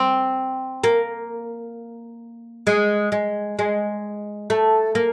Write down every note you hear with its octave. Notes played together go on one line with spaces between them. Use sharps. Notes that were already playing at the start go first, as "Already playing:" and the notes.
Already playing: C4
A#3
G#3
G#3
G#3
A3
A#3